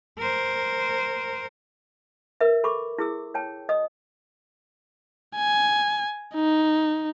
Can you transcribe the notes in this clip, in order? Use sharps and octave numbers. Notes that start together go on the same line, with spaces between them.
A#4 C5
A#4 B4 E5
A4 B5 C#6 D6
E4 G#4 E6
C#5 G5 A5
D#5 D#6
G#5
D#4